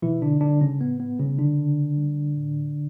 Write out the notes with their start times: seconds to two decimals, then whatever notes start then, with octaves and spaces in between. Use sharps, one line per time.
0.02 B2 E3 E4
0.22 D3 D4
0.41 D3 G3 D4
0.61 C#3 C#4
0.80 A2 B3
1.00 B3
1.19 C#3 G3 C#4
1.39 D3 D4
1.58 C#3
1.97 G3
2.36 A2